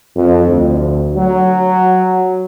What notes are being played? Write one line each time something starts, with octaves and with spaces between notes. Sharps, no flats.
F2
D2
F#3